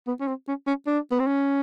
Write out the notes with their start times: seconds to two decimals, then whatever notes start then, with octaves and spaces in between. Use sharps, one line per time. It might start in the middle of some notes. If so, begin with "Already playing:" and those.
0.07 B3
0.20 C#4
0.28 C4
0.48 C#4
0.67 C#4
0.87 D4
1.11 B3
1.19 C4
1.27 C#4